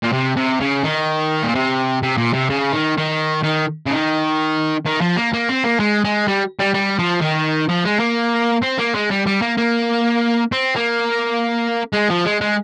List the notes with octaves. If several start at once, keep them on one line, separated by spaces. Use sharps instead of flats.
A#2
C3
C3
C#3
D#3
A#2
C3
C3
A#2
C3
C#3
D#3
D#3
D#3
C#3
D#3
D#3
F3
A#3
A#3
C4
A#3
G#3
G#3
G3
G3
G3
F3
D#3
F3
G#3
A#3
C4
A#3
G#3
G3
G3
A#3
A#3
C4
A#3
G#3
F3
G#3
G#3